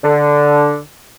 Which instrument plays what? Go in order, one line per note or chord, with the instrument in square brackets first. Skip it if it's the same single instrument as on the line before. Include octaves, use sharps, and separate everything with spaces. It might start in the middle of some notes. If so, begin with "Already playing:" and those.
[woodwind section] D3